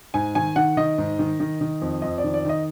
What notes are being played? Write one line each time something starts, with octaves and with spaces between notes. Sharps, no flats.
G#2 G#5
D#3 G#5
D#3 F#5
D#3 D#5
G#2
D#3
D#3
D#3
F2
F2 D#5
D5
D#3
D5
D#3 D#5